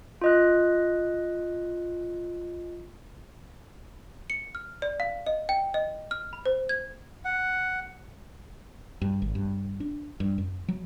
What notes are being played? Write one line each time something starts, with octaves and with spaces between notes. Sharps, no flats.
F4 D#5 F#6
C#7
F6
D5
F5
D#5
G5
D#5
F6
B5
C5
G#6
F#5
G2
G#1
G2
D4
G2
F#2
F#3